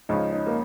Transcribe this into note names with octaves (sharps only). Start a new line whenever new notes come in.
C#2 C#3 F3 C#4 D#4
D#4
A#3